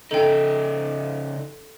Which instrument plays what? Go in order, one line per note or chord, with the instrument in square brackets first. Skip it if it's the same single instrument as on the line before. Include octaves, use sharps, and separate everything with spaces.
[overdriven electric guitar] C#3 D#4 [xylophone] A4 G5